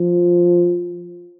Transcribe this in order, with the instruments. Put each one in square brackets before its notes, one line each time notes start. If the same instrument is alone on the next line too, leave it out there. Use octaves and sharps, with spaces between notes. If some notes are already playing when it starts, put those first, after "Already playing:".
Already playing: [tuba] F3